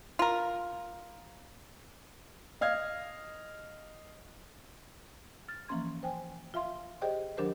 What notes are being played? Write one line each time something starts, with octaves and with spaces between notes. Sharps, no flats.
F4 A#4
D#5 F5 F6 G#6
F6 A6
E3 F3 A#3 C#4 C6 G#6
C5 G5 G#5
F4 E5 F5 C6
G4 G#4 C5 D5 D#5 G5
D#3 F#3 D4 G4 A#4 C5